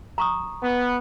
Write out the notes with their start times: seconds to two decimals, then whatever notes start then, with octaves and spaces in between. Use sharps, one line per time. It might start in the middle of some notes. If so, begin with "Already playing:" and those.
0.18 A#5 C#6 D#6
0.63 B3